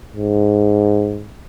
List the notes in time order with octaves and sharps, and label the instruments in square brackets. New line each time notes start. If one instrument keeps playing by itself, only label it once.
[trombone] G#2